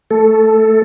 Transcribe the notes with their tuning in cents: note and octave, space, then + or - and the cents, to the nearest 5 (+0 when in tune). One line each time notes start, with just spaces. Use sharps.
A3 +0 A4 +0